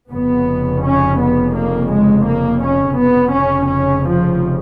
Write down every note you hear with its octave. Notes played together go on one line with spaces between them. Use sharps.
F1 F2 C#3 B3
C#4
B3
A#3
G#3
A#3
C#4
F1 F2 C#3 B3
C#4
C#4
F3